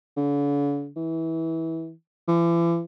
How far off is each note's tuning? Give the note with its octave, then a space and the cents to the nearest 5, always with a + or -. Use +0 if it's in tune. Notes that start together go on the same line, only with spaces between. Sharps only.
D3 -45
E3 -20
E3 +40